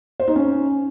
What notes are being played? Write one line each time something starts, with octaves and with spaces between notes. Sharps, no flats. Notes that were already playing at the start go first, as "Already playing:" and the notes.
C5
D#4
C#4